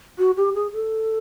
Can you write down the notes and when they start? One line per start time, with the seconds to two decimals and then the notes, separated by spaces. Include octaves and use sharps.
0.19 F#4
0.37 G4
0.55 G#4
0.73 A4